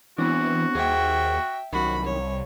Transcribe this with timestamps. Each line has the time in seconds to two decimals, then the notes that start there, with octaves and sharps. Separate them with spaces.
0.18 E3 B3 C4 D4 F#4
0.75 D#2 G#4 C5 E5 F#5 G5
1.73 C2 F#2 D#3 F#4 B5
2.04 C#5